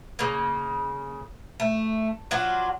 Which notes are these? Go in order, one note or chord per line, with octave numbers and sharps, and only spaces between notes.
C#3 A#3
A3
F#3 D4 F4 F#4